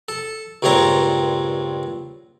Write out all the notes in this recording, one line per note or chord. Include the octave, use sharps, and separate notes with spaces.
A4
C#2 G2 A#2 C4 C#5 A#5